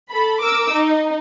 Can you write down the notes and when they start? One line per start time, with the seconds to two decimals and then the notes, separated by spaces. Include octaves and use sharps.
0.10 A4 B5
0.42 A#4 D6 E6
0.71 D#4